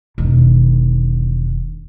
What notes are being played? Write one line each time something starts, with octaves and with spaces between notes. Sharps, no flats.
E1 D#3